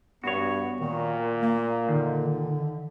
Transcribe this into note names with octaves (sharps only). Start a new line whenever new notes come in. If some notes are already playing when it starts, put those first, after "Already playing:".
G2 B3 F#4 C#5
A#2 D#3
A#3
D3 D#3